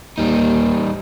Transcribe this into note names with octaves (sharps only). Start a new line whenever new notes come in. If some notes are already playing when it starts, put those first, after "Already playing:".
D#2 G3 D#4